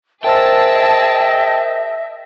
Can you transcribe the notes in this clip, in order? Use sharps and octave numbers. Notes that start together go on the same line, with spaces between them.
G#4 A#4 C5 D#5 E5 G5 A5 E6